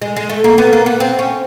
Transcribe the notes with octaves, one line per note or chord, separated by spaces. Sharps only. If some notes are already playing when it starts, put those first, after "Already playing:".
G#3
G#3
A3
A#3
B3
A#3
B3
C4
C#4